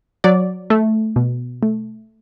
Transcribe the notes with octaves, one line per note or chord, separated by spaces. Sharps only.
F#3 D5
A3
B2
A3